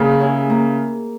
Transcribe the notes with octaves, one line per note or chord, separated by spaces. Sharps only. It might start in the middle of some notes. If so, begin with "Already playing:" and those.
Already playing: C#3 A#3
C#4 E4 G#4 C#5
A#3